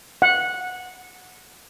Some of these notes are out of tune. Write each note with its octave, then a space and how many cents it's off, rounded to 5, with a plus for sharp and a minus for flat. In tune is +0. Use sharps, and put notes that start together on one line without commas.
F#5 -15